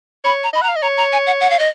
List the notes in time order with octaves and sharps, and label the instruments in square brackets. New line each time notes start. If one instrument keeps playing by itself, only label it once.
[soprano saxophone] C#5 [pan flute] B5
[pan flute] A#5
[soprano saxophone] D#5 [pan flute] B5
[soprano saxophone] F#5 [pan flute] A#5
[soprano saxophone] F5
D#5
[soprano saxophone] C#5 [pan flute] A#5
[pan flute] A#5
G#5
F#5
F#5
F5
D#5